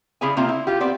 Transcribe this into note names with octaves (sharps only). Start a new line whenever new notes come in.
C#3 E4 G4 G#4 D5 G#5
C3 A#3 C4 F4
E4
F4 G4
B3 C4 D5